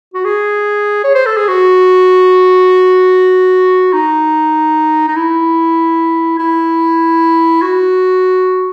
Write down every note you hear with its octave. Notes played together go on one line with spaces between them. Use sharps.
F#4
G#4
C#5
C5
A4
G#4
F#4
D#4
D#4
E4
E4
F#4